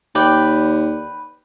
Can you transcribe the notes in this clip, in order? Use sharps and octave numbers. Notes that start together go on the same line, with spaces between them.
D#2 B4 D5 G5